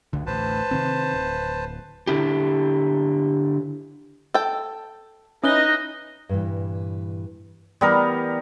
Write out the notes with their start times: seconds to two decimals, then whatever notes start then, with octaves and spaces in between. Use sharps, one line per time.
0.13 C#2 D3
0.27 A1 D2 B4 C5 A5
0.71 C3 D#3 C4
1.14 D1
2.07 D3 E4 G4
4.34 A4 G5
5.44 C#4 D#4 E4 B4 D#5 D#6 F#6 G7
6.29 G2 A#2 E3
7.81 E3 G3 B3 A#4